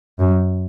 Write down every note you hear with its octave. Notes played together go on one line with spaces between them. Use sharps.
F#2